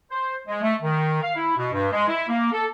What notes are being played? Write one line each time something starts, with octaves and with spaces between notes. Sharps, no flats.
C5
G#3
A3
D#3
F5
E4
B2
G2
G#3
E4
A#3
A4